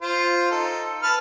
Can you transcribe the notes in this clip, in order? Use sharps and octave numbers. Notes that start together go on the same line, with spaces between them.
F4 C5
D#4 A4
B4 A5 F6